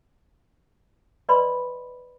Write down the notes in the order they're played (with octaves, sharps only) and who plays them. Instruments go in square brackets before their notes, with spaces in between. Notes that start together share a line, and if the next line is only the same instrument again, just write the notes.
[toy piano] B4 D5 D#5 B5 C6